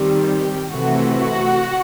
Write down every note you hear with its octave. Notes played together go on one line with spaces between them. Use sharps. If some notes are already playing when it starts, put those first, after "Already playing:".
Already playing: D#3 G3 C4
G4
C3 E3 A3 C4 F#4
F#4